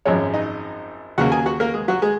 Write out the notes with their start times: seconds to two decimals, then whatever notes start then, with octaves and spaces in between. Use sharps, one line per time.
0.05 G#1 F#2 F3 G#3 C#4 C#5
0.33 D#4 D#5
1.18 D#2 C#3 F#3 A#3 F#4 F#5
1.32 G#4 G#5
1.46 F#4 F#5
1.60 A#3 A#4
1.74 G#3 G#4
1.88 F#3 F#4
2.02 G#3 G#4